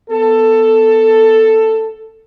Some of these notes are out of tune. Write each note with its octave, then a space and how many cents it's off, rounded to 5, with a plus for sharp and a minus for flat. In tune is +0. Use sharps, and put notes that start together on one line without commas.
B3 +0 A4 +10